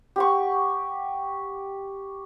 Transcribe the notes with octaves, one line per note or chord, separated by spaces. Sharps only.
G4 F#5 C#6